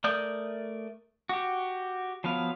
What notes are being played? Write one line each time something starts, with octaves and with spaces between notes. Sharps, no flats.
A3 A#4 D5 D#6 G6
F#4 G4
F3 F#3 B3 F5